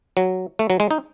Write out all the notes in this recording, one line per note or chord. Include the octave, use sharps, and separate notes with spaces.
F#3
A3
F#3
G#3
D#4